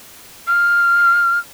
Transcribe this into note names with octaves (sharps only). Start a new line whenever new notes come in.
F6